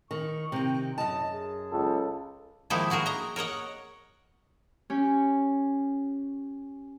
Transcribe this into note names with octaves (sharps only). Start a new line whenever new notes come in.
D#3 C#6
C3 D#3 G5
F#2 D#5 A5
G#4
C#2 A4
D#3 F3 G#3 A#3 D#4 E4
E4 F#4 G#4 A#4
D#5 A#5
A#4 C#5 D#5 F#5
C#4 G4